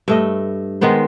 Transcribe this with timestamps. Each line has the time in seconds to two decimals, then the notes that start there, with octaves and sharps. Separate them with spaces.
0.08 G2 A3 D#5
0.81 D#3 G#3 B3 C5